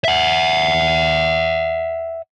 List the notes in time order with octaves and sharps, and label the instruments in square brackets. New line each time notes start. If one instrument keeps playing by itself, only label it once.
[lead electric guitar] E5 F#5